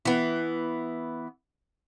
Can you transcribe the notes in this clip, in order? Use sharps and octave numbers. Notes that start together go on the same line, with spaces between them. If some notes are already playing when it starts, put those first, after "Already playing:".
E3 B3